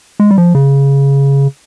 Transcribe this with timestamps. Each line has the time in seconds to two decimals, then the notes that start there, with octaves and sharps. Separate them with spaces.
0.20 G#3
0.31 G3
0.38 F3
0.55 C#3